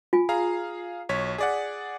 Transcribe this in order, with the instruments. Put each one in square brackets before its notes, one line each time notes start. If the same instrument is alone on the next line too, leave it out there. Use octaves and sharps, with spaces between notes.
[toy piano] F4 G#5
[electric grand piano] G#4 F5 A#5
B1 C#5 B6
G#4 D5 F#5